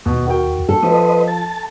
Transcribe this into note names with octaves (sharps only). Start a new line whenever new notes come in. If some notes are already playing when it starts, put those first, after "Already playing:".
D#2 B2
F#4 A#4 G5
A4
F3 B4 C5 D#5
A5